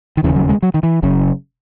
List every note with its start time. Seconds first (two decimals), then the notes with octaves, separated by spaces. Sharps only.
0.17 D#3
0.23 E1 D#2 C#3 E3
0.36 F#3
0.49 G#3
0.62 F#3
0.74 D#3
0.83 E3
1.03 F#1 F#2 C#3